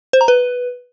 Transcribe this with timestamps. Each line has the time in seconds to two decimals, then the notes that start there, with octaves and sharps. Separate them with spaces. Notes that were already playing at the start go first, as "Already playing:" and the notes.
0.13 C5
0.21 A#5
0.28 B4